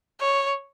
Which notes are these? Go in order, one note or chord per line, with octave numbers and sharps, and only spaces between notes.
C#5